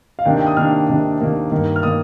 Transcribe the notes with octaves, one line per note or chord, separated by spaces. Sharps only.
F5
C3 D#3 A#3 D4 G5
G5
D#6
C3 D#3 A#3 D4 F6
C3 D#3 A#3 D4
C3 D#3 A#3 D4
G2 D#3 A#3
F6
D#3 A#3 D#6